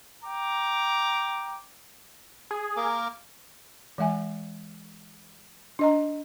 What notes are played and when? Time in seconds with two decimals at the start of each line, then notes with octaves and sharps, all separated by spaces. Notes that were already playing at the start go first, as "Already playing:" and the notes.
0.24 G5 A#5 D6
2.51 G#4
2.77 A#3 A#4 D6
3.98 E3 G#3 E5 G#5
5.79 D4 D#5 A#5